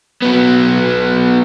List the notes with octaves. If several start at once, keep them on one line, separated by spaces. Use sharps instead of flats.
F#3 B3